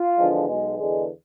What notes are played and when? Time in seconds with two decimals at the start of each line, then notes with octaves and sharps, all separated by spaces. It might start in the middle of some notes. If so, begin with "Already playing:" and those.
Already playing: F4
0.17 E2 D3 F3 G#3
0.47 B1 B2 G#3
0.77 E2 D3 G#3